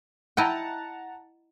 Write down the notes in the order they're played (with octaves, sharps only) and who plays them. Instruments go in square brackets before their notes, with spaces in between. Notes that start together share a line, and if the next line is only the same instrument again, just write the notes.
[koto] E4 D#5 G5 [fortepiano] F#5 A5 A#5